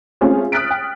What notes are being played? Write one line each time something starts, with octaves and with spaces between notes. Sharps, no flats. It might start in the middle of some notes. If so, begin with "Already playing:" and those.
G#3 A3 C4 C#4 F4 G#4
D#6 F6 F#6 A6 B6 D7
G5